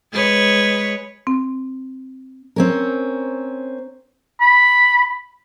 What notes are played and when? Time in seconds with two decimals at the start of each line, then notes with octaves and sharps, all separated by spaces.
0.13 G#3 B4 C#5
1.27 C4
2.56 C4 C#4 A#4
4.41 B5